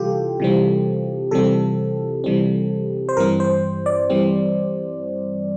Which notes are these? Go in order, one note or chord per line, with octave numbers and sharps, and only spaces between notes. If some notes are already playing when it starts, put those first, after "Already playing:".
Already playing: C3 E3 G3 F4 G4 A4
C3 E3 G3 C4
C3 E3 G3 C4 A4
C3 E3 G3 C4
C5
G2 E3 G3 C4 A#4
C5
D5
E3 G3 C4